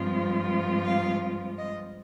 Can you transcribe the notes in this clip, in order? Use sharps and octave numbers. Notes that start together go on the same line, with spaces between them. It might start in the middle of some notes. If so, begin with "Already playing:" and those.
Already playing: G2 F3 G#3 C4 F4
F5
D#5